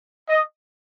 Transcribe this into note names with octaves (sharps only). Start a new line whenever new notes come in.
D#5